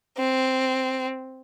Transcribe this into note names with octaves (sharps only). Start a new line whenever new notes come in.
C4